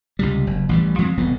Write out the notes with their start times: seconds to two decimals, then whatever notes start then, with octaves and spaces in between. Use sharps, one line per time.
0.19 C#2 C3 G3
0.47 F#1
0.69 A1 E3 G3
0.99 F3 G#3 A3 C4
1.17 E1 C2 A2 B3